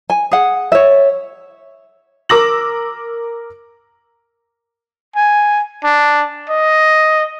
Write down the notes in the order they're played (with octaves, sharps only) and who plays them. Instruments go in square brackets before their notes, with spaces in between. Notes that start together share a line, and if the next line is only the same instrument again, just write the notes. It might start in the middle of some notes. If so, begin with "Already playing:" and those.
[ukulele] G#5
G#4 F#5
C#5 E5
[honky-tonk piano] A#4 D6 E6 A#6 F#7
[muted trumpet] G#5
D4
D#5